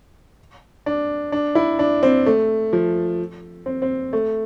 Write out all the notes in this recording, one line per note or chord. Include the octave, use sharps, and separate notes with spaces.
D4
D4
E4
D4
C4
A3
F3
C4
C4
A3